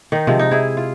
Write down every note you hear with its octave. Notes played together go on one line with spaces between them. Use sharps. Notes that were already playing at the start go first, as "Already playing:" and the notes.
D#3 D#4
C3 F3 G#3
D#4
E4 G#4
F4